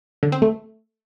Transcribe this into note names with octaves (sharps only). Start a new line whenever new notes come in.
D3
C4
A3